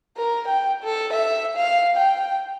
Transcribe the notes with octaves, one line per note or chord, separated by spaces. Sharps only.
A#4
G5
A4
E5
F5
G5